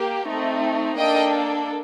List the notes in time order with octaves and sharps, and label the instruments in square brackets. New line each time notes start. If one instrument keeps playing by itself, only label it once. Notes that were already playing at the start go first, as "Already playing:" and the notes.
Already playing: [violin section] A#3 G4
A3 C4 D#4
A#3 D4 A4 D#5 G5